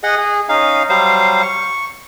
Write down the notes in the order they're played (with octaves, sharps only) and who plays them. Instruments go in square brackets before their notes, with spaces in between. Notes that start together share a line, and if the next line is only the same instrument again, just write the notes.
[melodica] G#4 D#5 F#5
G#4
C#4 D#4 F5
F#3 G3 C5 F5
C#6